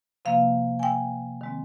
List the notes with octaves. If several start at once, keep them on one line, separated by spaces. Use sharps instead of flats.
C3 F3 A#3 F5
G#5
G5
D#3 G#3 C4